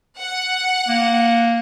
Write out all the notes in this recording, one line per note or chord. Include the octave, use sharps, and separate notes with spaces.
F#5
A#3